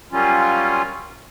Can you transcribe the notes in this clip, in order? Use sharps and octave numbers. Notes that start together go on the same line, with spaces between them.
F#3 G3 A#3 C#4 F4